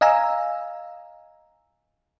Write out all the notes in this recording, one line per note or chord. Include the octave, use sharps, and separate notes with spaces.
D#5 F5 G#5 A#5 E6